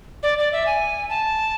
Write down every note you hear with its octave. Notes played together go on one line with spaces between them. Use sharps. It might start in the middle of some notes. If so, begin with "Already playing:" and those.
D5
D5
E5
G#5
A5